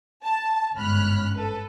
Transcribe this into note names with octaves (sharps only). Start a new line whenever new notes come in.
A5
G1 G#2 C#4 B5 F6 F#6
A4 B4